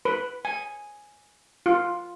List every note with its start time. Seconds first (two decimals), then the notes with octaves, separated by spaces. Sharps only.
0.05 B4
0.45 G#5
1.66 F4